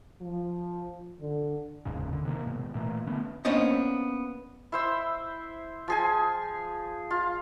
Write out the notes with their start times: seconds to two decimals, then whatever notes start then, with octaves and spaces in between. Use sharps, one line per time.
0.21 F3
1.20 D3
1.85 F1 D#2 G#2 C#3
2.13 D3
2.25 C3 D#3 G#3 A#3
2.47 G#2 B2
2.75 A#2 E3 A3 A#3
3.07 D3 A3 B3 C#4
3.45 A#3 B3 C#4 D4 C5 D#5
4.72 E4 C5 E6
5.88 F3 G#4 G#5
7.11 F4